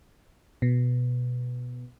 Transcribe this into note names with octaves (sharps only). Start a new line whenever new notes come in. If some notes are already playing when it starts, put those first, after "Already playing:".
B2